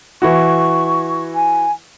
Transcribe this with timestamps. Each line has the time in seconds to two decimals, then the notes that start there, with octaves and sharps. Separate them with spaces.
0.22 E3 E4 F#4 C#6
1.35 G#5